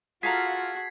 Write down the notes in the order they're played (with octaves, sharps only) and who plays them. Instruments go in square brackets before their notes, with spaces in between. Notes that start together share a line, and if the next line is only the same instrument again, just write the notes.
[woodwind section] F4 [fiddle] F#4 [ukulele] G#4 A4 A#5 [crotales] G#6 B6 C7